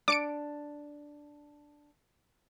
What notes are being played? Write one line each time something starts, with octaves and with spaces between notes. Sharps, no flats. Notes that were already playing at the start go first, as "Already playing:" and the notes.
D4 D6 C#7 D7